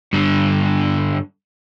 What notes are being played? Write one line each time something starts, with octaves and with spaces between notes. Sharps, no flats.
G2 D3